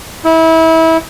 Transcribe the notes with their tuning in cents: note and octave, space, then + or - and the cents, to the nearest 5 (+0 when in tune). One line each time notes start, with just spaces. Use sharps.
E4 -25